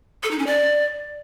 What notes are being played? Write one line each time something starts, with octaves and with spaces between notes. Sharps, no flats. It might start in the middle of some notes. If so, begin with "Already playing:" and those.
A4
D#4
C#4
D5